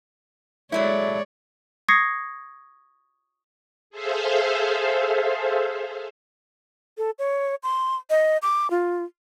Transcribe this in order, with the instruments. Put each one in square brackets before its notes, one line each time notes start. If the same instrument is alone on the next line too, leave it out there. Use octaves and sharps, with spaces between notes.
[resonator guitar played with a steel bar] F#3 A3 E4 [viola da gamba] G#3 C#5 D5
[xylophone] C#6 D#6 G#6 A#6 C7 C#7
[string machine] G#4 A4 C5 E5 F5
[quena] A4
C#5
C6
D#5
D6
F4